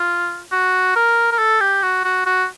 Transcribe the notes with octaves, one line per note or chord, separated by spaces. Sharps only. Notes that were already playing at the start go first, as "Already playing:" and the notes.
Already playing: F4
F#4
A#4
A#4
A4
G4
F#4
F#4
F#4